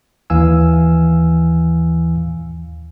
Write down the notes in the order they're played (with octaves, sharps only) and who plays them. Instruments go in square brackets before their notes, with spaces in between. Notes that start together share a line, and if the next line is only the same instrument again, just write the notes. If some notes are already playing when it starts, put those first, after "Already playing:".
[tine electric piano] D#2 E3 F5 G#5 E6